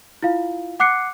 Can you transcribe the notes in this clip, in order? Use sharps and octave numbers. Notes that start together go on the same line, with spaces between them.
E4 F4 F5
F#5 D6 F#6 C7 C#7